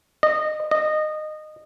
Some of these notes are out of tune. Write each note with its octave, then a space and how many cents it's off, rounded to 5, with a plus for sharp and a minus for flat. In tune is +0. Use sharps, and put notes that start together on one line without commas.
D#5 -25
D#5 -20